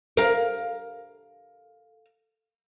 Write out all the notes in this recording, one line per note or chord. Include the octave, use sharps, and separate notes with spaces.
A#4 F5